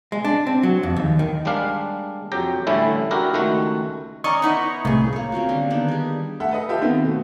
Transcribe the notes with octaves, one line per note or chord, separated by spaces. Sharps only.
G#3
D4
C4
F#3
F2
D#2
D#3
G3 G#3 A#3 D4 F5
F2 F#3 G4 G5 A#5
D3 E3 G3 A3 C#4 E4
D4 E4 F#4 G4 A#4
C#2 D#3 A3 F#4
C#4 D5 D#5 A#5 C#6
B3 D#4 E4
C2 A2 C#3 G#4
A#3 C#5
C4 C#4 F4 F#4
D3 G3 A#3 C6
D#3 B3 D4 D#4
G3 G#4
A3 A4 E5 F#5
A4 B4 D#5
F4 G4 E5
D#3 B3 C4
B2 A3